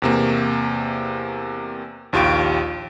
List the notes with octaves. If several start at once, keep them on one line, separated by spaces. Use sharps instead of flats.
E2 C3 A#3
A#1 D#2 F4 G4 C#6 D7